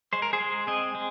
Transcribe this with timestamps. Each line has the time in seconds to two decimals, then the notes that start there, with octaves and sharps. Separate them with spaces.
0.13 G#3 C5
0.22 A#4
0.33 G#4 C5
0.40 G#3
0.67 C4 D#5 G#5
0.95 G#3